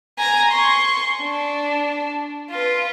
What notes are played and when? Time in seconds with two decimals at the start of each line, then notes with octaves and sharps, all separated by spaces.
0.18 G#5 A#5
0.51 C6 C#6
1.23 D4
2.51 F4 B4